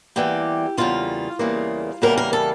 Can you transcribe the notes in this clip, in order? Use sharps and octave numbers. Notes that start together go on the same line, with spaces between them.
E2 C#3 E3 G3 A#3 G4
E2 C#3 E3 G3 A#3 F4
E2 C#3 E3 G3 A#3
E2 C#3 E3 G3 A#3 A#4
A#4
A4